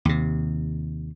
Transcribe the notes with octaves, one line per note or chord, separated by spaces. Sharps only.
D#2 C3